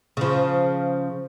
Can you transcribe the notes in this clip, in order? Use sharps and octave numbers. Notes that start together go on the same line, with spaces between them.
C#3 F3